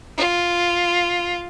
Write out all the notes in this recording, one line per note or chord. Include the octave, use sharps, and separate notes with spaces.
F4